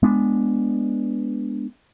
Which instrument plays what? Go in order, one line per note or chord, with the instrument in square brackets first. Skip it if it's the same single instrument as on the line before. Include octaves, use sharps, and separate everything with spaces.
[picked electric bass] G#3 B3 D4